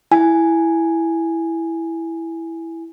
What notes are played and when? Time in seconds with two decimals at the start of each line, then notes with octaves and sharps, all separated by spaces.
0.11 E4 G#5